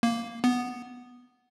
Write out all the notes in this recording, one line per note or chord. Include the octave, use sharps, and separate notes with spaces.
A#3
B3